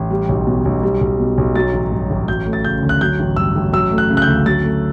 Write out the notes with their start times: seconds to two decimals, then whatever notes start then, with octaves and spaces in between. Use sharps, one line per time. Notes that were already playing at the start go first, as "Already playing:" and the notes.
Already playing: A1
0.11 G3
0.29 B1
0.47 B2
0.65 B1
0.83 G3
1.01 B1
1.20 B2
1.38 B1
1.55 F#3 A6
1.73 A1
1.92 G2
2.10 A1
2.28 F#3 G6
2.46 A3
2.53 A6
2.64 C#3 G6
2.83 D2
2.89 F#6
3.01 F#3 G6
3.20 A1
3.36 G2 E6
3.56 A1
3.73 F#3 E6
3.91 A3
3.98 F#6
4.10 C#3
4.17 F#6
4.22 G6
4.27 D2
4.46 F#3 A6
4.64 A3